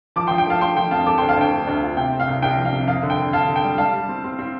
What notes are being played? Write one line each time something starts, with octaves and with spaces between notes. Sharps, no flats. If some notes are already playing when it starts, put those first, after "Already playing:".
F3 A5 D6
F3 G5 C6
G5
A3 F5 A5
A3 G5 C6
F3 G5
F2 F5 A5
A3 A5 D6
D2 G5 C6
F5 A5
D2 G5
A3
D2
F4
C3 G5
C4
F5
C2
C2 G5
F3
F5
C3
F2 F5
D3
G5
D3
D3 F5 A5
D3
G5
G3
G3 F5 A5
G3
C4
C4
C4